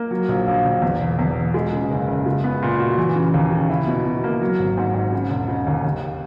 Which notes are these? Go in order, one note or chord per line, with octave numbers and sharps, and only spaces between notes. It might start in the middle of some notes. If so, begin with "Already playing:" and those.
Already playing: A#3
F#3
A#1
A#1
A#1
E2
E1
E2
E1
G#3
C#3
F#1
F#1
G#3
B3
A#2
F#4
E3
C#3
D#2
C#3
E4
B2
B2
A#3
F#3
G#1
G#2
G#2
C#3
E1
C#3
D#2
D#2